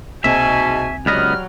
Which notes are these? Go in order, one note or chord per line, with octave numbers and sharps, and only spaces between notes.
C2 G#2 B2 A#3 C4 E5 G#5
C#2 F#3 G3 B3 D#5 F6